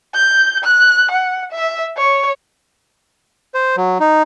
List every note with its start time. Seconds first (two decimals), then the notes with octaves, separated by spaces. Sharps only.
0.15 G6
0.64 F#6
1.11 F#5
1.52 E5
1.98 C#5
3.54 C5
3.77 F#3
4.00 D#4